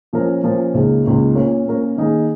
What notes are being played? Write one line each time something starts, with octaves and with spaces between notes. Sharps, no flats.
A#2 F3 C#4 A#4
A#2 F3 C#4 A#4
C#2 C#3 A#3 D#4
C#2 C#3 A#3 D#4
A#2 A#3 C#4 A#4 C#5
A#2 A#3 C#4 A#4 C#5
D#3 A#3 D#4 G#4